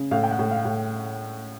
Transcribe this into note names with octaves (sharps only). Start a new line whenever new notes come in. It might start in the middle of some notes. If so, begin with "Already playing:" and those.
Already playing: C#3
A2 F5
G5
F#5
A2
F5
A2